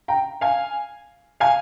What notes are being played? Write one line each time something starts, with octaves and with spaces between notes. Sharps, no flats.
G5 A#5
F5 G#5
F5 G#5